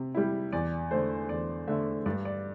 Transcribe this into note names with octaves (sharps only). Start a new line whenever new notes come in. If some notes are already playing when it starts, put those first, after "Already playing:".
Already playing: C3
G3 E4
E2 D5
D3 A3 C5
E2 D5
D3 A3 E5
G2 D5
D5